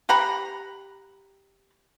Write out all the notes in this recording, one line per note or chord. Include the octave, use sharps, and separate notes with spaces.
G4 F#5 A#5 B5